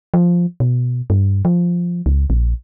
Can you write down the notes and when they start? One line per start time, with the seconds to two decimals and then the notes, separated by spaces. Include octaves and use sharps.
0.14 F3
0.60 B2
1.10 G2
1.45 F3
2.06 C#2
2.30 A#1